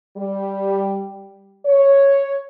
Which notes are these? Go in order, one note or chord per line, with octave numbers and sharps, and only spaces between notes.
G3
C#5